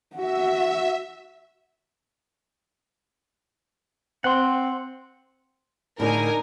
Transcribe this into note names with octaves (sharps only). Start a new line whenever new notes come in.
F#4 E5
C4 F#5 C6
A2 D3 D4 D#4 G#4 A#4 G#5